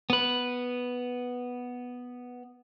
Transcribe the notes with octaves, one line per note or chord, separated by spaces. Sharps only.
B3 B4